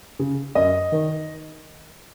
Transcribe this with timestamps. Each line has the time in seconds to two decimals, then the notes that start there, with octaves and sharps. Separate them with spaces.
0.19 C#3
0.55 F#2 D#5
0.92 D#3